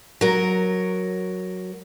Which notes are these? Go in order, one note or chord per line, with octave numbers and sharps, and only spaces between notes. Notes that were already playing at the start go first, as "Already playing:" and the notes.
F#3 A#4